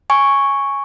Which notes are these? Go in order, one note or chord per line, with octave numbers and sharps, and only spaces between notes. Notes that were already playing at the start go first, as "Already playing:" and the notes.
G#5 C#6